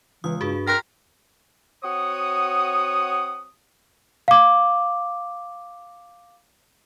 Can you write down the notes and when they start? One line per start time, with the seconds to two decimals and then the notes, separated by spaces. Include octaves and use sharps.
0.24 C#2 E3 D#6
0.41 G2 F#4 G#4
0.67 A#4 G5 A#5 C6 F#6 A#6 B6
1.84 C4 F#4 C#5 F#5 D#6
4.28 F5 D6